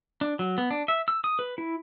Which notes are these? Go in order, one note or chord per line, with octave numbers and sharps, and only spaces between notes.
D4
F#3
B3
D4
E5
E6
D#6
B4
E4